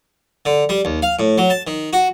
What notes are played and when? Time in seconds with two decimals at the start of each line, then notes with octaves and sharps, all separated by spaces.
0.45 D3
0.69 G3
0.85 D#2
1.02 F5
1.19 A2
1.38 F#3
1.50 A5
1.67 D#3
1.93 F#4